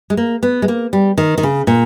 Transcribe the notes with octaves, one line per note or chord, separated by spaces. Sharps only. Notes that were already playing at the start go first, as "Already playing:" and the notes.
G#3
A#3
B3
G#3
A#3
G3
D#3
D#3
C#3
A#2